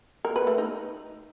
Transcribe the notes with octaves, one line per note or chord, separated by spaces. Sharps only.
A#4
B4
A3
D#4